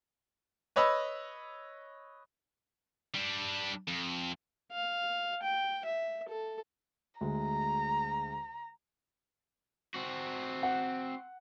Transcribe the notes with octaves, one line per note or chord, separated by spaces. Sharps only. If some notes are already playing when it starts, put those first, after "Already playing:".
B4 C#5 D#5 B5 E6
G3 D4
F2
F5
G5
E5
A4
D2 G#3 A#5
C4 F#4
F#5